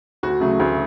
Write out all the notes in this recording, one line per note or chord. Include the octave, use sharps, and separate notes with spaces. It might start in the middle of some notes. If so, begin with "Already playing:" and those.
D2 F#4
C#3 F#3 A3
D2